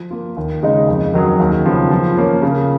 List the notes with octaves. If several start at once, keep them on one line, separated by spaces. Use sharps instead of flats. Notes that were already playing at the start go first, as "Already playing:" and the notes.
Already playing: F3
A#3 F4
D#2
C#3 G#3 D#4
F2
D#3 F#3 C#4 G#4
D#2
C#3 F3 B3
F3
A#3 C#4
C#3